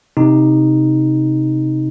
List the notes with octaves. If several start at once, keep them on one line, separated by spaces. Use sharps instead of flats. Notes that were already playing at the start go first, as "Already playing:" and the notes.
C3 D#4